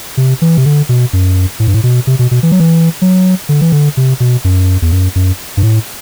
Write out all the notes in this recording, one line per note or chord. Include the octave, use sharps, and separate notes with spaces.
C3
E3
C3
D3
B2
F#2
A2
G2
A2
B2
C3
B2
B2
E3
F#3
E3
F#3
D3
E3
D3
C3
B2
F#2
E2
F#2
F#2
G2
A2